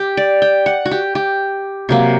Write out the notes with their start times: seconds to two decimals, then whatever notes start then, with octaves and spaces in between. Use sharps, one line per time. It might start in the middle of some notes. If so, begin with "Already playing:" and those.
Already playing: G4
0.17 D5
0.42 G5
0.66 F#5
0.86 F#4
0.91 G4
1.15 G4
1.89 C3 F#3 A#3